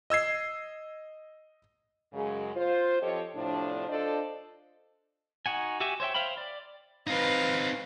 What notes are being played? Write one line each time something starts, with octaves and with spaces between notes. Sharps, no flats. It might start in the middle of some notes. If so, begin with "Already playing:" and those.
D#5 E6 G#6 C7
F#2 C#3 G#3
F4 C5
F3 C4 G4 A4 C#5 D#5
A2 C3 F3 D4
D4 F4 A4 C5 D5 D#5
D#4 F#4 F#5 G#5
F#4 G4 E5 G#5
C5 C#5 E5 G5
C5 E5 F5 G5 B5
D5
C4 D#4 B4 F5